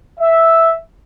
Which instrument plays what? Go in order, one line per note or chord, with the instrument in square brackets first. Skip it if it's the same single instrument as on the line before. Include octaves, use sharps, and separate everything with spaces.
[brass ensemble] E5